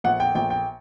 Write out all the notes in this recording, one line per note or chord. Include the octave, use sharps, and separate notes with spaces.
A#1 F#5
G5
A#1 G5
G5